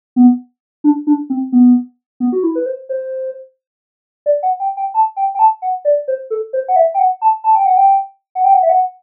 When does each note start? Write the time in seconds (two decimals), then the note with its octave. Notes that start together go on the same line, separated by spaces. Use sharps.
0.16 B3
0.84 D4
1.07 D4
1.30 C4
1.52 B3
2.20 B3
2.32 F#4
2.43 E4
2.55 B4
2.66 C5
2.89 C5
4.26 D5
4.43 F#5
4.60 G5
4.77 G5
4.94 A5
5.16 G5
5.35 G5
5.39 A5
5.62 F#5
5.85 D5
6.08 C5
6.30 A4
6.53 C5
6.68 F#5
6.76 E5
6.94 G5
6.99 F#5
7.22 A5
7.44 A5
7.55 G5
7.66 F#5
7.77 G5
8.35 F#5
8.44 G5
8.53 F#5
8.63 E5
8.69 F#5